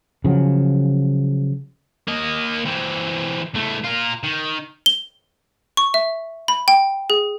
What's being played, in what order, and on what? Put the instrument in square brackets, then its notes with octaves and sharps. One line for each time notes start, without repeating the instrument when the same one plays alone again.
[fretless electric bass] C#3 F3 F#3
[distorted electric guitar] A#3 D#5
E3 C4
E2 A3
F4 A#4
D#3
[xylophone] G7
C#6
E5
B5
G5
G#4